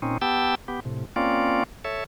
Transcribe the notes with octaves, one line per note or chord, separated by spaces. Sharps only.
A#2 C4 C#4 D#4
B3 G4 G5 A5 E6
B3 G4
A2 C3
A#3 C4 C#4 F4 D5
A4 C#5 E5